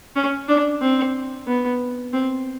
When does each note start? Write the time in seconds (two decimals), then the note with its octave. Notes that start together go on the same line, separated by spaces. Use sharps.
0.16 C#4
0.48 D4
0.81 C4
1.47 B3
2.14 C4